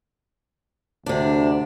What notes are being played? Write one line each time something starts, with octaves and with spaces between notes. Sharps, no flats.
D2 C3 D4